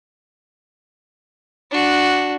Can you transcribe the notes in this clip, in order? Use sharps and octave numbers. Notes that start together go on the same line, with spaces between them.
D4 F#4